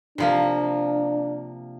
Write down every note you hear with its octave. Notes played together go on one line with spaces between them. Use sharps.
C3 F3 A#3 D4